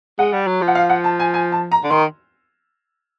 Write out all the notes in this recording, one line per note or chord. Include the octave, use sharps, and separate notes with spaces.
G#3 F#5
G3
F#3
F3
F#5
F5
F#5
A5
G#5
G#5
A5
A#5
D3
D#3 C6